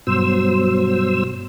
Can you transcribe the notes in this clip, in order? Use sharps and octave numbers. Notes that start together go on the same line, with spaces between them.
G2 B2 F#3 C5 E6